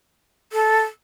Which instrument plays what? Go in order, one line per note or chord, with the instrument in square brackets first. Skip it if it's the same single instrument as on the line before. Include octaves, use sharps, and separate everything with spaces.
[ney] A4